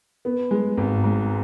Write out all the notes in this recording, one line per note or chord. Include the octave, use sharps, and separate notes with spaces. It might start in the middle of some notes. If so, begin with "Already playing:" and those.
B3
G#3
G#1
G#2